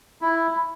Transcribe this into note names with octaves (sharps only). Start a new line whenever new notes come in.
E4